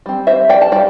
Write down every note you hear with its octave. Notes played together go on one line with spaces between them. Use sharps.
G3 C4
C5 E5
D5 G5
A5
G3 D5 G5